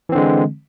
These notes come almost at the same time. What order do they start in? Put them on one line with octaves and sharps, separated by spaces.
E3 C4 D3 G#3